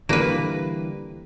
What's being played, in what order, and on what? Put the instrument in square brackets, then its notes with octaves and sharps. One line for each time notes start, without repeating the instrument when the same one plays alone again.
[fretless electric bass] D3 E3 G3 [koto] A#3 B4